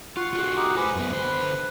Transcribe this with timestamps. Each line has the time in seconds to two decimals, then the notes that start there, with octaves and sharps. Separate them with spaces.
0.17 F4 F#5 C6 C#6
0.33 F4 F#4 G#4
0.57 D#4 G4 F#5
0.77 B4 C5 G#5
0.95 F#2 B3
1.12 D3 C5